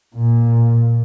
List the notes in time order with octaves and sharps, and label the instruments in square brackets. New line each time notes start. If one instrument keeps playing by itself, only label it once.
[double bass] A#2